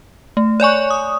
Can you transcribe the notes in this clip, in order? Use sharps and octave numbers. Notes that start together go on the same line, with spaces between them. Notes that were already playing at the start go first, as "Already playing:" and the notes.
A3
C#5 D5 G#5 C#6
D#6